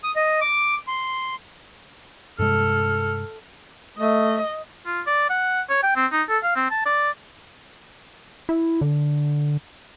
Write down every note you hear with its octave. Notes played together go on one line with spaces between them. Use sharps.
D#6
D#5
D6
C6
G2 C3 G#3 A4 F6
A3 D#5
F4
D5
F#5
C#5
G5
C4
D#4
A4
F5
C4
A5
D5
E4
D3